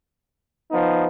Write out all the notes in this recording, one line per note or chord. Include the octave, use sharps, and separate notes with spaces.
F3 B3 D#4